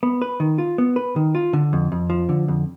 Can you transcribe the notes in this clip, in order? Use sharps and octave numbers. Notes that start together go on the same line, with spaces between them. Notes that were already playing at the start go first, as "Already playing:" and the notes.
B3
B4
D#3
F4
B3
B4
D#3
F4
D3
F2
F2
F3
D3
F2